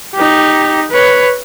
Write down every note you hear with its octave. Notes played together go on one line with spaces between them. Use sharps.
D#4 G4
B4 C#5